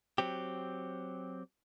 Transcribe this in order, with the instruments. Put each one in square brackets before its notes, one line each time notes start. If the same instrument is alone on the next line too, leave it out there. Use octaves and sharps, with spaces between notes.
[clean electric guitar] F#3 C4 G4